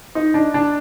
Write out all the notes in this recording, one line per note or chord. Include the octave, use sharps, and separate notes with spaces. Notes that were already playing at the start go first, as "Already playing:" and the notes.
D#4
D4
D4